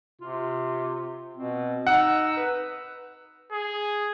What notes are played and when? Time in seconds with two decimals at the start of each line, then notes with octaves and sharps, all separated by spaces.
0.21 C3 F4
1.37 B2 C4
1.87 D#4 F#5 E6
2.37 B4
3.52 G#4